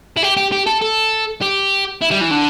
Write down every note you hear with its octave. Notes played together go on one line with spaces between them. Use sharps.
E4
G4
G4
G4
A4
A4
G4
E4
G3
E3
D3